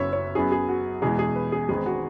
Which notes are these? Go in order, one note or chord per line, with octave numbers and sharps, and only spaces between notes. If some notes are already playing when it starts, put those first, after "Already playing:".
Already playing: F#1 F#2 F#3 B3 C#5 E5
C#5
F#2 F#3 B3 G#4
G#4
F#4
E2 B2 G#3 G#4
G#4
B4
G#4
G#1 G#2 G#3 B3 G#4
F#4